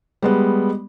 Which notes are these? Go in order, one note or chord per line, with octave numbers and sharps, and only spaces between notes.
G3 G#3 B3